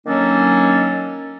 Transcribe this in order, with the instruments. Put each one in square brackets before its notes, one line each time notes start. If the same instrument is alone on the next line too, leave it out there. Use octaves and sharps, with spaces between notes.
[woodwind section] D#3 F#3 A#3 C#4 D4 A4